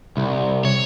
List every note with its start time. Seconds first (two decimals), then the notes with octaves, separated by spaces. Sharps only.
0.17 C2
0.65 C#5